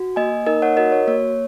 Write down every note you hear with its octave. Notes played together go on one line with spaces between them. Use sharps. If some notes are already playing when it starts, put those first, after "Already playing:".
Already playing: F#4
A#3 D#5 G#5
D#4 A#4 D#5
C#5 F#5
F#4 A#4 D#5
C#5
A#3 C#5